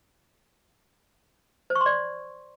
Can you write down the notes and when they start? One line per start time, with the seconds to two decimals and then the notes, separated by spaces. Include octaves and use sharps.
1.70 C5
1.75 C#6
1.81 C6
1.86 D5